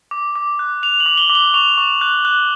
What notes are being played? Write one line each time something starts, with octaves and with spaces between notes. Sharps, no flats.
D6
D6
F#6
F#6 F7
F#7
D6
G7
D6
G7
C#6 F7
C#6
F#6
F#6